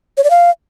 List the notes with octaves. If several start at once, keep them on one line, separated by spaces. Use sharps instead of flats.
C#5
D5
F5